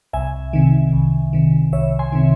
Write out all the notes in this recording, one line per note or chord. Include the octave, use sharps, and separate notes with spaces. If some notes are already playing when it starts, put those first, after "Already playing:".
C2 E5 G#5
C3 D#3
C2
C3 D#3
C2 C#5 E5
G#5 C6
C3 D#3